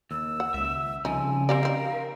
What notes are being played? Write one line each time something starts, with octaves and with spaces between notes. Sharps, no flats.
D#2 E6
F#5
C#2 E5
C2 C#3 F3 D#4 G#5
C4 G4 A#4 D5 F5
D#3 C4